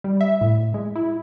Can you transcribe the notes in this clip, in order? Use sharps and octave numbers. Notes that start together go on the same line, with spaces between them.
G3
E5
A2
G#3
E4